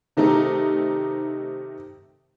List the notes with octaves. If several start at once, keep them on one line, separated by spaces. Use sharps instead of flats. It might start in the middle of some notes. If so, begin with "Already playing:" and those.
C3 D#3 A3 D#4 G4